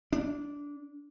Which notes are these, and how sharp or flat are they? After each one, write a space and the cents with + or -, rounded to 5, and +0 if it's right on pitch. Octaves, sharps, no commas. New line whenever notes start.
D4 -20